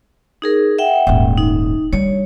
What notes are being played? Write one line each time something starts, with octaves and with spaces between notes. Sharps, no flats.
D#4 G#4 A#4
E5 F#5 G5
D#1 G#2
D#4
G3 D4 C#5